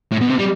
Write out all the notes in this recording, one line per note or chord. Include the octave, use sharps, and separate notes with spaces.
A2
B2
C3
G3